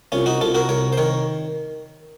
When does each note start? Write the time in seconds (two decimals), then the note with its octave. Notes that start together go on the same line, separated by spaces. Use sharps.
0.12 C2 C#4 F4
0.26 D#4 F#4
0.41 C2 F4 A4
0.54 F#4 A#4
0.69 C2 A#4 C#5
0.93 C5
0.97 D#3 A#4 C#5